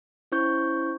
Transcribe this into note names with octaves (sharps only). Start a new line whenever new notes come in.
C#4 E4 C5 C#6 G6